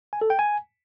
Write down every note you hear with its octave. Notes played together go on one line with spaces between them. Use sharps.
G#5
A4
G5
G#5